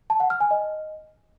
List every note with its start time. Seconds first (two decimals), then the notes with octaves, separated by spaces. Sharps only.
0.10 A5
0.20 F#5
0.30 F6
0.40 G#5
0.51 D#5